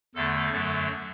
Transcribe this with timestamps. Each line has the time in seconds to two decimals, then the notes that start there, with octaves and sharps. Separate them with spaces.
0.15 E2 D3 A3 A4
0.51 F#2 D3 F#3 A3